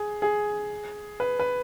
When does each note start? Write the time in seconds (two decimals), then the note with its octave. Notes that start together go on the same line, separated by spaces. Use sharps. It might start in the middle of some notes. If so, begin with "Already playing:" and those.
Already playing: G#4
0.22 G#4
1.20 B4
1.40 B4